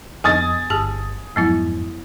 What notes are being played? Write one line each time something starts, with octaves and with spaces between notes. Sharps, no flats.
F2 B3 G#4 D#5 G#5 D#6 A6
G1 G4 G#4 A5
F2 G#2 F#3 B3 E4